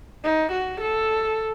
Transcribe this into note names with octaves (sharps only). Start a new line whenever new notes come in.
D#4
F#4
A4